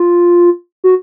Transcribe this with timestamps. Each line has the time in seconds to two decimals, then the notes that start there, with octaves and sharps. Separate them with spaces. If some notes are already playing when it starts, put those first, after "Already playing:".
Already playing: F4
0.84 F#4